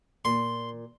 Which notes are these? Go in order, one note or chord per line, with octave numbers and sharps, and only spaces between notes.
A#2 C6